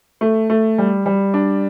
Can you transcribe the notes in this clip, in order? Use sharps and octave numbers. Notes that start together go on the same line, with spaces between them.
A3
A3
G3
G3
D4